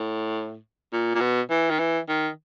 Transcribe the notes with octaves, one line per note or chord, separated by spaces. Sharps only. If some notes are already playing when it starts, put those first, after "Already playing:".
Already playing: A2
A#2
A#2
B2
E3
D#3
E3
D#3